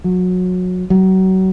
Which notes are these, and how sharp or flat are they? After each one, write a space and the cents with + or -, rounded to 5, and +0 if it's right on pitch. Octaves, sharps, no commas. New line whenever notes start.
F#3 -25
F#3 +30